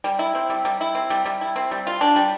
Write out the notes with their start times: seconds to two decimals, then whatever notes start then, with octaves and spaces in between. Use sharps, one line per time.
0.04 G3
0.19 E4
0.35 C4
0.50 G3
0.65 G3
0.81 E4
0.95 C4
1.10 G3
1.25 G3
1.41 E4
1.56 C4
1.71 G3
1.87 F4
2.01 D4
2.16 G3